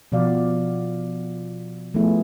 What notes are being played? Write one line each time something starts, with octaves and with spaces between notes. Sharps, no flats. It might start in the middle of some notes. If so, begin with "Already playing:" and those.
B2 F3 F#4 D5 F5
F3 A3 B3 E4 G#4